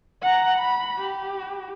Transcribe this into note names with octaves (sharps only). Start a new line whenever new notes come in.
F#5 A#5
B5
G4